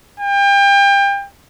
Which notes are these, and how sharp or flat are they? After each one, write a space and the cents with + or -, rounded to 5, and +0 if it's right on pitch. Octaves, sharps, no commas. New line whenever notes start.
G5 +30